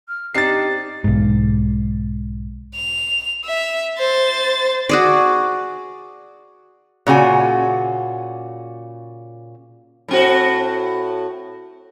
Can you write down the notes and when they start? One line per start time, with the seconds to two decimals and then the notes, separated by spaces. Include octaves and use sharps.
0.08 F6
0.35 C4 D4 D#4 G4 A6 C7
1.04 B1 G#2
2.75 F7
3.45 E5
3.98 C5 A6
4.89 F#4 G#4 D5
7.07 A#2 C#3 F#4 G#5
10.08 A2 C4 F#4